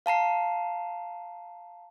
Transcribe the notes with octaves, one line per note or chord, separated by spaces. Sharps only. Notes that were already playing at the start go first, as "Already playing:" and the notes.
F5 A5 A#5 C7